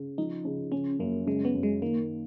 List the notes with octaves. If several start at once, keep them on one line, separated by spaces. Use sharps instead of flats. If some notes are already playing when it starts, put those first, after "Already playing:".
Already playing: C#3
F3 D#4
C#3
C#3 C#4
F#2 A#3
C#3 G#3
B3
F#2
G#3
D#3 A#3